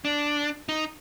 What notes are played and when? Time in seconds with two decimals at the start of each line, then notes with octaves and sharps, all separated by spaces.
0.05 D4
0.69 D#4